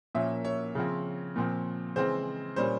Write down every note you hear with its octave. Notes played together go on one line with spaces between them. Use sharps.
A#2 F3 A#3 C#4 E5
C#5
C#3 F3 C4
A#2 F3 C4
C#3 E3 G#3 C4 C5
A#2 G3 C#4 C5